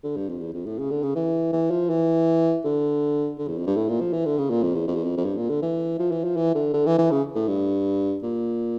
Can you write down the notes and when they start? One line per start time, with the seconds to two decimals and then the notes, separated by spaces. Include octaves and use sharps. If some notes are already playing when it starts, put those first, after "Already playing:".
0.04 D3
0.17 G2
0.29 F2
0.41 E2
0.53 F2
0.66 A2
0.79 C#3
0.91 D3
1.03 C#3
1.15 E3
1.52 E3
1.71 F3
1.90 E3
2.64 D3
3.39 D3
3.48 E2
3.58 F2
3.67 G2
3.76 A2
3.88 A#2
4.01 F3
4.13 E3
4.25 D3
4.38 C#3
4.50 A#2
4.63 F2
4.75 E2
4.87 F2
4.96 E2
5.04 F2
5.17 F2
5.25 G2
5.37 A#2
5.50 D3
5.62 E3
5.99 F3
6.12 E3
6.24 F3
6.36 E3
6.55 D3
6.74 D3
6.86 E3
6.98 E3
7.11 C#3
7.35 A2
7.48 G2
8.23 A#2